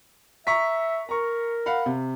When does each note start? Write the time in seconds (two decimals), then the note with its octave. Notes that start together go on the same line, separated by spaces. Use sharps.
0.47 E5 A#5 C#6 B6
1.09 A#4 A#5 C#6
1.66 F5 F#5 B5
1.86 C3